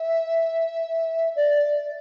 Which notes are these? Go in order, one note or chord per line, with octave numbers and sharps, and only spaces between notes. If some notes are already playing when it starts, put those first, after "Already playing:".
Already playing: E5
D5
D5